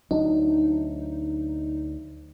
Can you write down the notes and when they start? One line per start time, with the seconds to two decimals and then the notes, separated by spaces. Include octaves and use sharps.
0.11 D2 F#3 D4 D#4